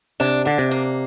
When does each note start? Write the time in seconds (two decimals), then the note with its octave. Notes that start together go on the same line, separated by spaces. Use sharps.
0.20 C3 D4
0.45 D3 D4
0.58 C3
0.71 A#3